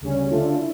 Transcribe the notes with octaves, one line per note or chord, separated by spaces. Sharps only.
D2 C#3 G3 C#4
D3 A3 D4 F4 A4
E4